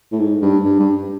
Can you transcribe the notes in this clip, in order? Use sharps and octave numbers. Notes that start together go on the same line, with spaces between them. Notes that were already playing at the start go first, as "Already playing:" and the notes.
A2
G#2
G2
G2
G2